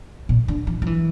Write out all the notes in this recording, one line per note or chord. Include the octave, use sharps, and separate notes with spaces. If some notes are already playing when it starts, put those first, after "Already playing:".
A#2
D3
E3
F3
E3